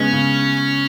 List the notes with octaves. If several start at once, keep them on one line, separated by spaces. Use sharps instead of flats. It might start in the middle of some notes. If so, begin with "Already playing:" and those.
Already playing: C#3 G#3 B3 C#4
C#3